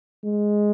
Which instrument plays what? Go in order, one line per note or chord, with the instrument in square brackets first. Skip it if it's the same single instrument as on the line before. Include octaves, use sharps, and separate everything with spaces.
[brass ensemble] G#3